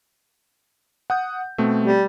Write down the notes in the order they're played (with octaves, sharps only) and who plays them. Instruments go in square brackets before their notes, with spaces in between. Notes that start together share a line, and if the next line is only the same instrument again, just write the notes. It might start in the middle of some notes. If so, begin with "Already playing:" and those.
[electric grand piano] F#5 D#6 G6
B2 A3 C4
[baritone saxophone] G3